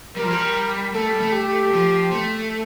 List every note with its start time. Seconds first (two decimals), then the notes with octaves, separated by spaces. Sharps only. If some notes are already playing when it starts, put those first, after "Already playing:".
0.17 G3 A#4
0.23 F3
0.31 G3
0.94 A3 A4
1.07 G3
1.20 A3
1.33 G4
1.73 F3
2.12 A3